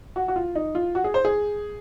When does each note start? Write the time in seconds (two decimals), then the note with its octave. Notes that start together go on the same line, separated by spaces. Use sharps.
0.16 F#4
0.28 F#4
0.36 F4
0.55 D#4
0.75 F4
0.95 F#4
1.04 G#4
1.14 C5
1.25 G#4